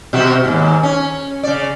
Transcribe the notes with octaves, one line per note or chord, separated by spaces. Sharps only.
B2 F#4 G4
D#2 G#2
C#4
C#3 D5